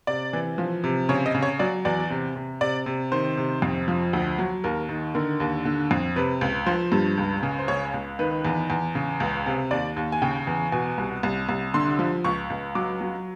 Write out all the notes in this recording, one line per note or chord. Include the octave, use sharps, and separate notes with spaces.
C3 D5
E3
F3
C3
C#3 C#5
D#5
C#3
C#5
F#3 D5
E2 D5
C3
C3
C3 D5
C3
D#3 C5
C3
F2
F3
D2
F#3
D#2 A#4
D#3
D3 A#4
D#2
D3
F2
C3 B4
C#2
F3 C5
G2
C#2
C#3
C5
C#2 C#5
C#2
D#3 B4
E2
E2
C#3
C#2
C3
D#2 D5
D#2
G#5
C#3 G5
E2
B2 G#5
C2
C2
C2
D3 C6
F3
C#2 C#6
C#2
F#3 D6
F#3